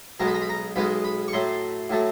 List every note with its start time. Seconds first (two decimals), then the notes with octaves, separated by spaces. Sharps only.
0.20 B1 B2 G#3 B3 A#5
0.27 B5
0.34 A#5
0.42 B5
0.49 A#5
0.76 B1 B2 G#3 B3 B5
1.04 B5
1.28 C#6
1.33 A2 F#3 A3 C6
1.90 A2 F#3 A3